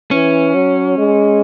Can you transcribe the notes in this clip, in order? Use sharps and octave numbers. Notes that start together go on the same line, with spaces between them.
E3 C#4
F#3
G#3